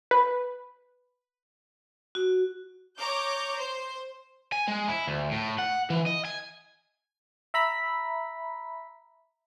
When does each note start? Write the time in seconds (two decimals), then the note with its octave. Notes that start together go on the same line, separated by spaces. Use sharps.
0.11 B4
2.15 F#4
2.98 C#5 A#5 D6 G6
3.56 C5
4.52 G#5
4.68 G#3
4.88 E4
5.08 D2
5.31 A2
5.59 F#5
5.90 E3
6.06 D#5
6.25 G#5
7.54 E5 A#5 B5 B6